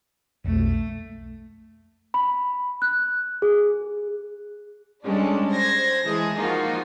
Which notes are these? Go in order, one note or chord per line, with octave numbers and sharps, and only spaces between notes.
B1 F2 A3
B5
F#6
G#4
G3 G#3 C#4 D4 A4 D5
C5 G#6 A#6
E3 G#3 G#4 A5
F3 A#3 D#4 F4 F#4